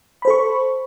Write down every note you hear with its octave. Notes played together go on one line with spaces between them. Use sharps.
A4 C5 B5 C#6